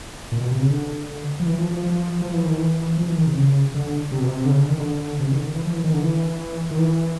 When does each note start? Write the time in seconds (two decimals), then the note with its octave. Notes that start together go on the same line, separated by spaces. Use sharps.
0.32 A#2
0.41 B2
0.51 C3
0.60 C#3
0.70 D3
1.40 F3
1.46 E3
1.58 F3
1.71 F3
1.83 F3
2.22 F3
2.33 E3
2.45 D#3
2.57 E3
2.98 F3
3.08 E3
3.17 D#3
3.27 C3
3.36 C#3
3.74 D3
4.12 C3
4.20 B2
4.28 C3
4.45 D3
4.50 C#3
4.60 D3
4.69 D#3
4.79 D3
5.20 C3
5.27 C#3
5.32 D#3
5.36 D3
5.45 D#3
5.55 E3
5.65 F3
5.74 E3
5.84 D#3
5.93 D3
6.03 E3
6.71 D#3
6.79 E3